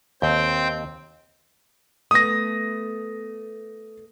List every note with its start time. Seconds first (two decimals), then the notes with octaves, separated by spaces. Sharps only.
0.22 D#2 C4 G5
2.11 A3 B3 D#6 A#6